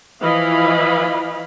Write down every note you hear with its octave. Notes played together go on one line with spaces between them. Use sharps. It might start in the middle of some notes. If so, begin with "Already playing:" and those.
E3 F3 E4 D#5 F5 B5